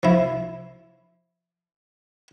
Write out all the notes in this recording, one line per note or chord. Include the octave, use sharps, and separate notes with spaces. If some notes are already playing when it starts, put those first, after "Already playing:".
F3 E4